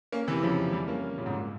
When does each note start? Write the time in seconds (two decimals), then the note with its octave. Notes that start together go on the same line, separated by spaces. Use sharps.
0.12 A#3 C#4
0.27 C3 E3
0.43 C#3 F3
0.72 E3 G3
0.88 A#3 C#4
1.18 A#2 C#3
1.26 G#2
1.33 A#2